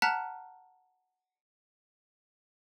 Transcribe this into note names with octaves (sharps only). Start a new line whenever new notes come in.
F#5 A5 A#5 F6 F#6 B6